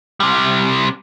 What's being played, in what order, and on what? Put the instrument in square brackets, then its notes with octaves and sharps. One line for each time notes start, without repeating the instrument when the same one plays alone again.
[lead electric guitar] C3 G3